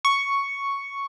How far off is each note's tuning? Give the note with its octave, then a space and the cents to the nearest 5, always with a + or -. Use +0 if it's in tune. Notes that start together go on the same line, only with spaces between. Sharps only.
C#6 +5